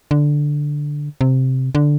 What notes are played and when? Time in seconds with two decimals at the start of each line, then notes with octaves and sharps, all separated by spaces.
0.11 D3
1.21 C3
1.75 D3